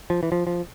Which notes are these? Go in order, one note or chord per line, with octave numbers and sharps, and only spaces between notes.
F3
E3
F3
F3